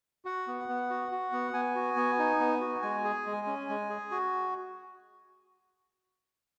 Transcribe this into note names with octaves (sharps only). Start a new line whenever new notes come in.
F#4 F#5
B3
B3
F#4
F#4
B3
B3 G#5
F#4
B3
D#4
B3
F#4
G#3 G#5
G#4
G#3
C#4
G#3
G#4
F#4